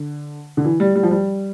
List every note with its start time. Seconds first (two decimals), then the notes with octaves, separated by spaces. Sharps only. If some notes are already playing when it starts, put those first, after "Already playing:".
Already playing: D3
0.57 D3
0.64 E3
0.80 G3
0.95 G3
1.03 F3
1.11 G3